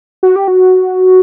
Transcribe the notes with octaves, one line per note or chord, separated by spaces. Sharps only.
F#4
G4
F#4